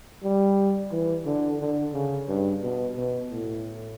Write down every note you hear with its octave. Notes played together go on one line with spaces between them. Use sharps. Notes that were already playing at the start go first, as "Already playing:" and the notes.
G3
E3
D3
D3
C#3
G2
B2
B2
A2